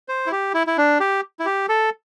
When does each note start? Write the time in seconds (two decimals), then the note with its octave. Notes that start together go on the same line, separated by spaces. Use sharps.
0.09 C5
0.26 E4
0.32 G4
0.54 E4
0.67 E4
0.78 D4
1.00 G4
1.40 E4
1.46 G4
1.69 A4